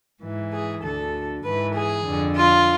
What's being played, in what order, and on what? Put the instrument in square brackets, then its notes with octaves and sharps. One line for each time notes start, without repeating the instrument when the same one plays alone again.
[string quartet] G#2 E3
G#4
D2 D3 A4
G#2 E3 B4
G#4
F2 D3
F4